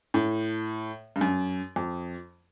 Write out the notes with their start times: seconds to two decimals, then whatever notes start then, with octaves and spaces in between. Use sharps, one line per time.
0.14 A2
1.16 G2
1.21 F#2
1.76 F2